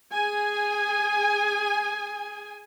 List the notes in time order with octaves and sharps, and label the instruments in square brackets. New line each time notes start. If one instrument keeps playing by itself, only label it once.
[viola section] G#4 G#5